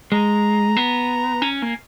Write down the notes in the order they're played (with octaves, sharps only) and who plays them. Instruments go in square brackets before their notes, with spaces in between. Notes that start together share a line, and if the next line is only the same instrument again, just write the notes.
[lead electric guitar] G#3 [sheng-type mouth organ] A#5
[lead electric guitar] B3
[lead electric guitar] C#4 [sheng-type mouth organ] G#5
[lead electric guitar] A#3